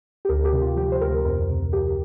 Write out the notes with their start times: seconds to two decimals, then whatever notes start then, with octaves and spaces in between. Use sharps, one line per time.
0.25 G4
0.29 D2 A#4
0.45 G4
0.53 C3
0.61 F4
0.76 F3 G4
0.92 C5
1.01 D2 A#4
1.25 F2 A#4
1.49 C3
1.73 F3 G4